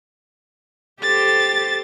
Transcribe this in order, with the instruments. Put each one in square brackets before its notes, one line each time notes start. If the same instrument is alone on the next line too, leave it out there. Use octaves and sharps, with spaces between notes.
[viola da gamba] G4 A4 C5 [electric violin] A6